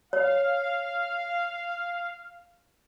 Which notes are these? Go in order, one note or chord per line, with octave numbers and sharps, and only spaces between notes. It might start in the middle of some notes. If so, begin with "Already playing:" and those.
C#5 F5